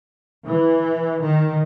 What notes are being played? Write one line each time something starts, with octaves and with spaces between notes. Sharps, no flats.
E3
D#3